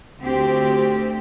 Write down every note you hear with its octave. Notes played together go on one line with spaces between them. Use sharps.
D2 C4 G4